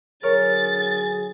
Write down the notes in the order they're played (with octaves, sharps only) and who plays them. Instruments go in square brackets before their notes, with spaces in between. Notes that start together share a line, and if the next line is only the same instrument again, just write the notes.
[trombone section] D3 F#3 G#4 [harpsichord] A#4 C#5 [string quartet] A6